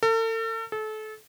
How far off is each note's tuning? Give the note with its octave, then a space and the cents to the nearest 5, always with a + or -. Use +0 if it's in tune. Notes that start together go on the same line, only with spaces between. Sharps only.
A4 +40
A4 -30